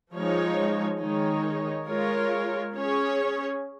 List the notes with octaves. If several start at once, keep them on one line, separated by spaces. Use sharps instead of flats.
F3 G#3 D#4 C#5
D#3 G#3 D#4 C#5
G#3 F4 A#4 C#5
C#4 G#4 C#5